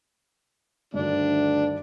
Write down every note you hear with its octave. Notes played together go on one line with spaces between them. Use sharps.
D2 G2 D#3 D4